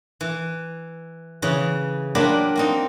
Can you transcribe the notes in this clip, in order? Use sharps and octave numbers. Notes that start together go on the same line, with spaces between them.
E3
C#3 E3
F#3 A#3 D4 F4 G4 B5
A#3 C4 D#4